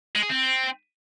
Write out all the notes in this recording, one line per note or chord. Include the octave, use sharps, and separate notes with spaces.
G#3
G#4
C4